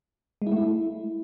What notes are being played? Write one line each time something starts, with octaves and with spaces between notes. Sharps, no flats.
G#3
E4
A3
E4